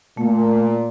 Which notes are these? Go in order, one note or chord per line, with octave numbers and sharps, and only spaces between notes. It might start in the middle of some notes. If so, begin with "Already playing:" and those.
A#2 A3